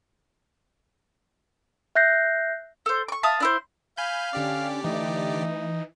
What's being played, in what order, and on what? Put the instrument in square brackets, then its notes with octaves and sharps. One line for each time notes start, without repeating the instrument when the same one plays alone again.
[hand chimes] E5 F#6 G6 A#6 C7
[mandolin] A4 C5
C#6 D6
E5 F5 A5 D#6
D4 E4 C5
[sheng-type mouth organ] F5 [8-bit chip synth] G#5 B5 G6
[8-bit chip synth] D3 G4 D5 [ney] C#4
[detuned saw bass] E3 [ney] A3 [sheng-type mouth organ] D#4